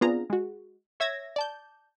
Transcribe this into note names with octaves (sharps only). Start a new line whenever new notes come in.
B3 C4 D4 F4 G#4 A#5
G#3 F#4
C#5 E5 E6 G#6 A#6
D5 A5 G6